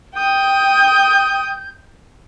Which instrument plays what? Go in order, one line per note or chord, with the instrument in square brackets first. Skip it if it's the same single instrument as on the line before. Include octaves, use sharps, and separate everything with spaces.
[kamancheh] G5 D#6 [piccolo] G6